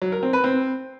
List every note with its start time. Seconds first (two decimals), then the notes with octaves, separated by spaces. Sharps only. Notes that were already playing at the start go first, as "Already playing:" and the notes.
0.02 F#3
0.12 A#4
0.23 C4
0.33 B4
0.44 C4